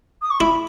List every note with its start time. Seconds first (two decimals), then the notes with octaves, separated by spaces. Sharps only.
0.22 D#6
0.30 C#6
0.40 E4 B5